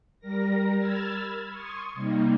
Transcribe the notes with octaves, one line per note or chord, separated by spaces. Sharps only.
G3 A#4 A#6
B5 E6 F6 G#6 A6
C6 C#6 D#6 G#6
C3 G3 A#3 D#4